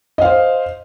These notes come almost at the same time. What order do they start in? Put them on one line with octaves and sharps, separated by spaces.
D#5 F5 C5